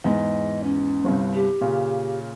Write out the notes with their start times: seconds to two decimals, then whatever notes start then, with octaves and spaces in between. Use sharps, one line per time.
0.04 E2 G#2 D#5
0.63 C#4
1.04 G1 C2 G2
1.34 G4
1.61 A#2 C#3